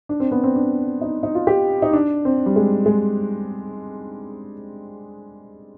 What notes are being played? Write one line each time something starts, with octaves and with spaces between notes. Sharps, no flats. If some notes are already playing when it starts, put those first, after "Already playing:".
D4
C4
B3
C4
D4
D#4
D#4
F4
G4
D#4
D4
C4
G3
G#3
G#3